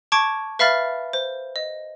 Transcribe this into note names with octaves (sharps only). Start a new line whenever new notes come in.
A5 C#6 D6 G#6 D7
B4 E5 F5 B5 F6 A6
C5
D#5